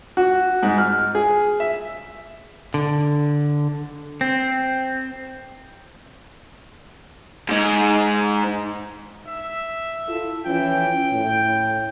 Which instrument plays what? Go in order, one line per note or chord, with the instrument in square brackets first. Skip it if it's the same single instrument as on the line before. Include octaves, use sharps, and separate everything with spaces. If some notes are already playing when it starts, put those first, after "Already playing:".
[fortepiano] F#4
G#2
F6
G#4
E5
[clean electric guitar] D3
C4
[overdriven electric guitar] G#2 G#3
[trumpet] E5
[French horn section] E4 F4 A4
[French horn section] E3 F3 C#4 [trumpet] G5
[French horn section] A2